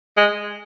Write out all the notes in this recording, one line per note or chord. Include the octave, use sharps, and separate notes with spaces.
G#3